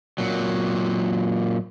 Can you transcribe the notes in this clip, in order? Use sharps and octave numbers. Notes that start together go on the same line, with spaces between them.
A#2 F#3